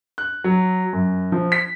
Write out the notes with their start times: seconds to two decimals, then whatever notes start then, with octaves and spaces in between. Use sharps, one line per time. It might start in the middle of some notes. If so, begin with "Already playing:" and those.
0.18 F#6
0.44 F#3
0.93 F#2
1.32 F3
1.52 B6